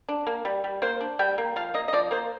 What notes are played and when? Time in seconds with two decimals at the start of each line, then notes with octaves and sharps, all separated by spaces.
0.09 D4
0.27 A#3
0.45 G3
0.64 G3
0.82 A#3 C5
1.01 D4
1.19 G3 G5
1.38 A#3
1.56 F3 F5
1.74 A#3 D#5
1.88 D#5
1.93 F3 D5
2.11 A#3 C5